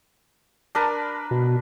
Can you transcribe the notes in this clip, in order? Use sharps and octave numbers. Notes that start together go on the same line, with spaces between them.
D4 A#4 B4
B2